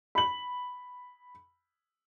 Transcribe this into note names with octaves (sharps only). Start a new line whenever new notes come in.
B5 F#7